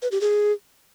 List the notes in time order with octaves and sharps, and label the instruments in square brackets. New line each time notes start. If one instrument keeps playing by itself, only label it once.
[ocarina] B4
G4
G#4